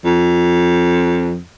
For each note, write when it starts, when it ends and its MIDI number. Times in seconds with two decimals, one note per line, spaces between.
0.05 1.40 41